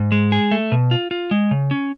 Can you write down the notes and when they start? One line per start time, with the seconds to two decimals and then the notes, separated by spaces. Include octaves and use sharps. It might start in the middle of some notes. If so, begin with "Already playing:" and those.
Already playing: G#2
0.12 G#3
0.32 G#4
0.51 A3
0.72 B2
0.91 F4
1.11 F4
1.31 G#3
1.51 C#3
1.71 C#4